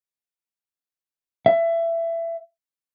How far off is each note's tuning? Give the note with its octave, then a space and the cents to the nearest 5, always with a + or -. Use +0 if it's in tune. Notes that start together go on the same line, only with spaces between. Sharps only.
E5 +20